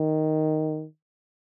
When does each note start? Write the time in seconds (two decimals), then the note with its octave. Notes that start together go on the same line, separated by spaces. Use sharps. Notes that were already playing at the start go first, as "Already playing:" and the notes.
Already playing: D#3